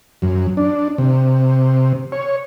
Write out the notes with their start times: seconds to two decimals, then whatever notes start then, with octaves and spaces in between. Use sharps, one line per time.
0.22 F#2
0.57 D4
0.98 C3
2.12 C#5